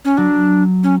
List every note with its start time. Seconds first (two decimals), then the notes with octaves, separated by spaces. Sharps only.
0.05 C#4
0.17 F#3 D4
0.83 C#4